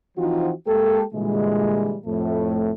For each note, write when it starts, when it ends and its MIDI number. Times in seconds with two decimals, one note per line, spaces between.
0.18 0.50 52
0.18 0.50 53
0.18 0.50 60
0.18 0.50 63
0.18 0.50 65
0.18 0.50 66
0.67 1.03 56
0.67 1.03 58
0.67 1.03 67
0.67 1.03 69
1.14 1.95 46
1.14 1.95 50
1.14 1.95 52
1.14 1.95 55
1.14 1.95 56
2.06 2.71 41
2.06 2.71 45
2.06 2.71 57